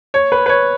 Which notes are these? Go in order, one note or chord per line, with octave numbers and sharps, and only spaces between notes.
C#5
B4
B4
C#5